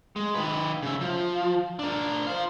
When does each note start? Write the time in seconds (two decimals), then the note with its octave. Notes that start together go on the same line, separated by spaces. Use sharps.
0.16 G#3
0.35 D#3 B4
0.83 C#3 E5
1.01 F3
1.79 D4 A#4
2.27 C5 F5